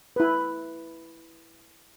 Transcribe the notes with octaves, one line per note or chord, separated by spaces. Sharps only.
E4 B4